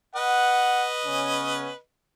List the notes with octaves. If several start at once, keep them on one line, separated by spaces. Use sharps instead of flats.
B4 D#5 F#5
C#3 B3 C#4